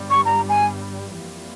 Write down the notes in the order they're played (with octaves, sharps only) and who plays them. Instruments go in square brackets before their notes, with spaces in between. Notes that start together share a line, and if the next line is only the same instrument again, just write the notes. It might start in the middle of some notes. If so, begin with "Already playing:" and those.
Already playing: [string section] G1 G2 G3
[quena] C#6
A#5
G#5
[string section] F2 E3 G3 A#3 F4